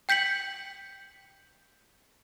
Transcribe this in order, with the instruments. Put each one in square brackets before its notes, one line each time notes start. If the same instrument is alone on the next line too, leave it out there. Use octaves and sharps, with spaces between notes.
[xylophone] G5 G6 B6 C#7 F#7